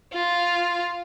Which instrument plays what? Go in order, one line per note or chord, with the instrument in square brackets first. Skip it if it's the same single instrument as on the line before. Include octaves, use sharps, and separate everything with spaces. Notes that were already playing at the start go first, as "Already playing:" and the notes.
[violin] F4